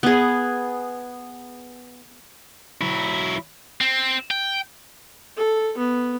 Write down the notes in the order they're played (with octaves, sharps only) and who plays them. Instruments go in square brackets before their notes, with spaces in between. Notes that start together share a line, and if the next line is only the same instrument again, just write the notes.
[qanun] B3 G#4
[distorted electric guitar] F#3 E4
C4
G5
[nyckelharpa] A4
B3